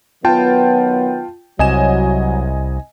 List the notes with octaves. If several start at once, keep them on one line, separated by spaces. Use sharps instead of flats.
D#3 F#3 B3 F4 G5 A5
C2 F#3 D#5 G#5 E7